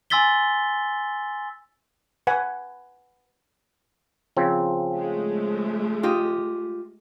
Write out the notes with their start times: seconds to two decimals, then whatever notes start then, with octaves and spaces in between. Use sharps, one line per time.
0.10 G#5 C6 E6 A6 B6 G7
2.27 B4 F#5 G#5
4.37 C#3 F3 C4
4.95 G#3 A3
6.03 F4 G4 D#5